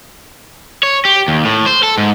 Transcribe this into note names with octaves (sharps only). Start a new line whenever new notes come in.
C#5
G4
D#2
A2
C5
A4
G#2